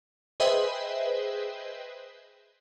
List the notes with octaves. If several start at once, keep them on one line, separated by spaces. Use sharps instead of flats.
G#4 B4 C5 D#5 E5 G5